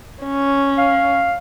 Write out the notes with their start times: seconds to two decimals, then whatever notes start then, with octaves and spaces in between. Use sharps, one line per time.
0.23 C#4
0.78 F5